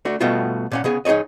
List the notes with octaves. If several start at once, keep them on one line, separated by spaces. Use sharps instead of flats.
A3 D4 F#4
B2 G3 A3 B3 F4 F#4
A#2 C#4 F#5
C#3 B3 G#4
D#4 G#4 A4 C#5 D#5